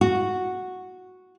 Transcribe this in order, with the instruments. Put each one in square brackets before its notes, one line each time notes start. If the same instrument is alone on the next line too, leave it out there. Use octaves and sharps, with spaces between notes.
[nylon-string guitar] F#4